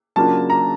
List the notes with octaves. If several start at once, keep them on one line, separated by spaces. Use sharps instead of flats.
C#3 F#3 A#3 D4 F4 A5
A#5